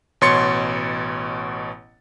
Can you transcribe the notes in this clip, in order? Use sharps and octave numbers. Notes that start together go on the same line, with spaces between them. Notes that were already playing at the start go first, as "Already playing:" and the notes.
A1 B2 C#5 C6 A6 C#7